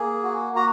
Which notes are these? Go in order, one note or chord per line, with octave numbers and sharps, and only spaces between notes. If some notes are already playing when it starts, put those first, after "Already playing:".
Already playing: A#3 G#4
F#4
F#4 A#5